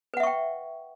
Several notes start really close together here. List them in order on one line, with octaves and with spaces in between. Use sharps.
B4 F#5 E5 C#6 G5